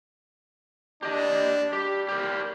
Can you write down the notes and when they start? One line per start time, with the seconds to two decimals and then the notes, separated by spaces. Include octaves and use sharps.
1.03 D4 G4 D#5
1.73 G3 G4
2.08 G4 A#4